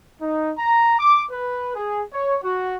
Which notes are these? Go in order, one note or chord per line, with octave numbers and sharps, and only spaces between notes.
D#4
A#5
D6
B4
G#4
C#5
F#4